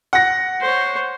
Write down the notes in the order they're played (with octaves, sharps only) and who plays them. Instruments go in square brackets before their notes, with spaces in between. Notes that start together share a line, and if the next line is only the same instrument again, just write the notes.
[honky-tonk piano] F#5 A#6
[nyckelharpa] C5 C#5